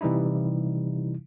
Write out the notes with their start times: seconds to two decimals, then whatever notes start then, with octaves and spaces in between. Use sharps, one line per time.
0.01 C3 E3 G3 D#4 E4